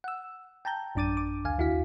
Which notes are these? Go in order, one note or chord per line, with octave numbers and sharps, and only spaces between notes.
F#5 E6
G5 A5 A#5 G6
A1 F#2 D4 D6 A6 D#7
D6
D2 F5 G#5
D#2 E4 F#4 F5 B6